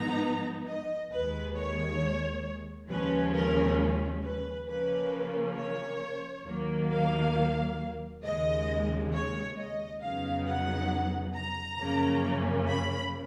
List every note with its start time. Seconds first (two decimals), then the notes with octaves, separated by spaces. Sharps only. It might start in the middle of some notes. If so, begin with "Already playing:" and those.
Already playing: G#2 F3 B3 D#4 A#5
0.66 D#5
1.11 D#2 D#3 G#3 B4
1.55 C#5
2.89 D#2 C#3 F3 G#3 C#4 B4
3.34 A#4
4.22 B4
4.67 C#3 F3 A#3 C#4 B4
5.55 C#5
6.45 D#2 D#3 F#3 A#3
6.90 F5
8.23 D#2 C#3 G#3 D#5
9.12 C#5
9.57 D#5
10.01 F2 C#3 F#3 B3 D#4 F5
10.46 F#5
11.35 A#5
11.79 F#2 C#3 F3 A#3 C#4
12.68 B5